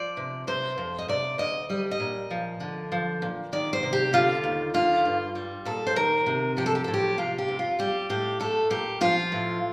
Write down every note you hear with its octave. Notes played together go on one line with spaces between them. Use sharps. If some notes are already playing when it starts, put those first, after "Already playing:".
Already playing: F3 D5
C3
C3 C5
F2
D#5
C3 D5
D2 D#5
G3 D#5
D#5
A#2
F3
D3
F3
A#2
D#3 D5
C5
C3
G4
D3 F4
D#2
D3 F4
G2
G3
A#2 A4
C5
D#3 A#4
C3
F3 G4
A4
G4
A2 A4
G4
C3 F4
G4
F2
F4
G3 G4
A2 G4
A3 A4
A#2 G4
F3 F4
A2